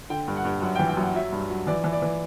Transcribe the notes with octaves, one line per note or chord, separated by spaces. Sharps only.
D3 G5
G2
F#5
G2
F#2 F#5
G5
E3
G5
F#2 F#5
F#3 E5
G2
F#3
E3 D5
E3
D5
E3